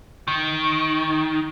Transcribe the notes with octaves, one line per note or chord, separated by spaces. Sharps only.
D#3